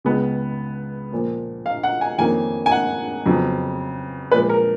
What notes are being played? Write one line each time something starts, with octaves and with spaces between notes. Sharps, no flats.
C#2 C#3 G#3 B3
A#2 F3 A#3
F5
F#5
G#5
F2 D#3 A#3 C#4 G#5
G#5
F#5
F2 C#3 F#3 B3
A#2 F3 G#3 B4
A#4